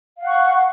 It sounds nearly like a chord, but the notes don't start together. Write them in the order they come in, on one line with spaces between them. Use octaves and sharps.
F5 F#5 C#6